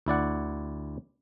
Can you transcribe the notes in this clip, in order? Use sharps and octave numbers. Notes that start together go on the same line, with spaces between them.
D2 E4 D5 F#5